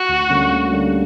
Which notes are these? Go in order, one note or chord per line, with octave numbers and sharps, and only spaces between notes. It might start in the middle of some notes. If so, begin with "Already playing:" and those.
Already playing: F#4
D2
D3 G3 A#3 C#4
D2
D3 G3 A#3 C#4